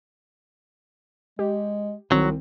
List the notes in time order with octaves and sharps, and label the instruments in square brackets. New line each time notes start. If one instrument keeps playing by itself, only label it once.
[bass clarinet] G#3 [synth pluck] G4
[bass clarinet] C2 [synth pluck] D#3 C4 [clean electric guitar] F#3